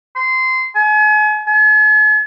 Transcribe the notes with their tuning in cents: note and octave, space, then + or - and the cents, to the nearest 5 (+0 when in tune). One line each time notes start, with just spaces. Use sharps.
C6 -15
G#5 +40
G#5 +45